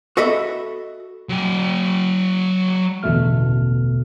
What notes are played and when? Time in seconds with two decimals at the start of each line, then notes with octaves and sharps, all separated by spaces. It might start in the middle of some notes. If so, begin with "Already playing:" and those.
0.17 F#4 A4 D#5 E5 B5
1.29 F#3 G5
3.03 A1 E2 B2 D3 A3 F6